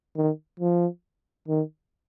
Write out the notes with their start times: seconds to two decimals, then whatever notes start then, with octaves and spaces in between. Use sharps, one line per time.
0.16 D#3
0.60 F3
1.48 D#3